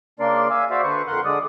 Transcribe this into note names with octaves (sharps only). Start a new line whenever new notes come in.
C#3 A#3 D4 A#4 D5 C6
E5 F5 G#5
F#4 C5 D5 E5 F5
D3 B4 C5 C#6
F2 A#4 F#5 C6 F#6
D3 G#3 D5 D#6